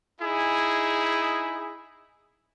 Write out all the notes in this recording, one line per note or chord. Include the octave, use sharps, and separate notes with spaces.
D#4 E4 G#4